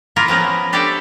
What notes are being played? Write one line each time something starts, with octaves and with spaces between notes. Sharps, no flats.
A#3 E4 F4 A#4
F3 B3 C#4 A#4 A#5
D4 G4 A4 C#5 D5 E5